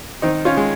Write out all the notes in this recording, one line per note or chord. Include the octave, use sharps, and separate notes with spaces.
D#3 C4 D#4
C#4 F4
G#3